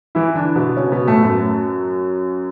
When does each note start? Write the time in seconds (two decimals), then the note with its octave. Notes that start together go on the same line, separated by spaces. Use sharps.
0.15 E3 E4
0.35 D3 D4
0.56 B2 B3
0.77 C#3 C#4
0.92 B2 B3
1.07 A2 A3
1.22 F#2 F#3